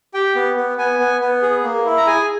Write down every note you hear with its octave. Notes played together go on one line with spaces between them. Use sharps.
G4 G5
B3
B3
B3 G#5
B3
B3
G#4
A#3
E4
A#5
G#4 G#5